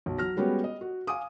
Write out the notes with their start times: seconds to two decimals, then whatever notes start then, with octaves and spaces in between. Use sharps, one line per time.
0.06 B1
0.18 F#3 F6 A#6
0.37 G3 G#3 B3 C#4 F#4 G4
0.64 D#5
0.81 F#4
1.07 F5 G#5 D6 D#6